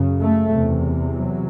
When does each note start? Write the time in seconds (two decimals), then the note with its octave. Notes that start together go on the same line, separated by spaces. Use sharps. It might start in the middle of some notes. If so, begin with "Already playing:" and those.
Already playing: F#2 C#3
0.21 A3
0.51 E2 C3
1.12 F#3